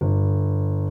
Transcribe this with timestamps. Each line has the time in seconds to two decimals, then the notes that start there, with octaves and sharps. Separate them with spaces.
0.01 G1